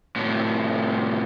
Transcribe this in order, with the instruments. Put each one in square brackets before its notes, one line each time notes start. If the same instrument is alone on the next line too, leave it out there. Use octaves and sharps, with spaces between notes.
[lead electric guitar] A2 C3